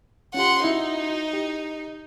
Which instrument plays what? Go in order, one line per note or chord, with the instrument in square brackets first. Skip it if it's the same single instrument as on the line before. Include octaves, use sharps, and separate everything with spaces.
[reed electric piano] C#4 F4 G4 [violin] F#5 C6
[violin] D#4 [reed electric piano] E4 F#4
[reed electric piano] G4